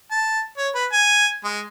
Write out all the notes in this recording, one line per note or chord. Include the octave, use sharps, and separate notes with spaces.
A5
C#5
B4
G#5
G#3